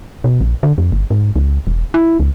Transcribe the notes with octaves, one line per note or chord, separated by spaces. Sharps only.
B2
A#1
D3
F2
G1
G#2
C#2
E1
E4
C#2